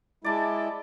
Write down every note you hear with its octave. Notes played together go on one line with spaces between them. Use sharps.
G#3 E4 D5 A5 D6